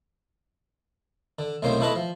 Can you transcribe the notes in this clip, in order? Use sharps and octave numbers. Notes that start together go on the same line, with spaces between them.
D3
B1 A2 C3 A#3 D#4 C5
G#3 A3 E4 A4 B4 D#5
F3